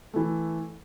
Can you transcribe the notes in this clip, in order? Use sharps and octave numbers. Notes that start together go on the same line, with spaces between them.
E3 A3